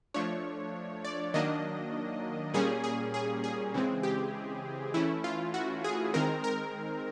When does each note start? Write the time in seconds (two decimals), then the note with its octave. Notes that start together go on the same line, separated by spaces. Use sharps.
0.14 F3 A3 D4 C#5
1.05 D5
1.34 D#3 F#3 A#3 D4 D#5
2.54 A#2 G3 A#3 C#4 G#4
2.84 G#4
3.14 G#4
3.44 G#4
3.74 C#3 E3 G#3 C4
4.03 G4
4.94 E3 A3 C#4 E4
5.24 F4
5.54 F#4
5.84 G#4
6.14 D#3 G#3 C4 A#4
6.44 A#4